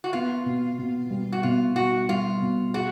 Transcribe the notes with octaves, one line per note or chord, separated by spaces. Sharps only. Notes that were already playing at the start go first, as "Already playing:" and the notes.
F#4
B3 F4
B2
B2
G3
F#4
B2 F4
G3 F#4
G3 F4
B2
F#4 G#4